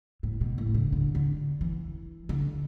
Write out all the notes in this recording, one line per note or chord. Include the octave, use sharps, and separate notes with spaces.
A2
B2
A2
D3
D3
D3
E3
D3